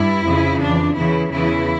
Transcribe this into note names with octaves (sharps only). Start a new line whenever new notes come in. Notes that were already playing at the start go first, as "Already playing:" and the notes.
Already playing: G2 E4
F2 C#3 E3
F2 E3 D4
E2 C#3 E3 E4
E2 C#3 E3 E4